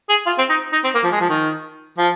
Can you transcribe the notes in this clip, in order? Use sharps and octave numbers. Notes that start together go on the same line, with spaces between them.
G#4
F4
C4
D#4
D#4
C4
A#3
F3
G#3
F3
D#3
F3